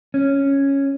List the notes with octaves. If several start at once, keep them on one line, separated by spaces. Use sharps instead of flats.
C#4